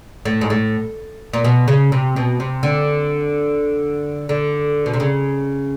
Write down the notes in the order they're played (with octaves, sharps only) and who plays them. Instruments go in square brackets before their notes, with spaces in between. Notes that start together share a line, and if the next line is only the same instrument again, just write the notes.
[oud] A2
G#2
A2
A#2
B2
C#3
C3
B2
C3
D3
D3
B2
C3
C#3